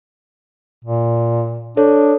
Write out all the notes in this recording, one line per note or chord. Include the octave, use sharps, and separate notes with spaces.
A#2
D4 A4 C#5